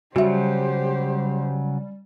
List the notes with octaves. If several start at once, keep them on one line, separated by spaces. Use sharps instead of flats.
C#3 F#3 G3 F#4 G4 C5 E5